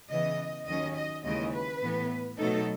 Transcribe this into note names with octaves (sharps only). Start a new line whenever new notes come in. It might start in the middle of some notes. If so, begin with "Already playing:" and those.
C#3 E3 B3 D#5
D#2 D#3 F#3 C#4 D#5
D#5
D#2 C#3 E3 G#3 D#5
B4
A2 E3 B3
B2 F#3 A3 D#4 A4